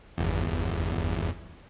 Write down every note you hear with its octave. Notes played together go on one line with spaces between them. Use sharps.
G1 E2